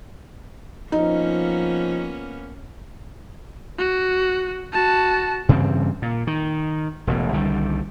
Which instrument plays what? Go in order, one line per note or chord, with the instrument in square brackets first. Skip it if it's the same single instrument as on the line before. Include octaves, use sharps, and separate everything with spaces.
[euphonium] F3 [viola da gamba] A#3 B3 C#4 [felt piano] D#4
[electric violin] F#4
F#4 A5
[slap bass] G2 C#3 E3 C4
A#2
D#3
E1 A1 B2
C2 D3 D#3 G3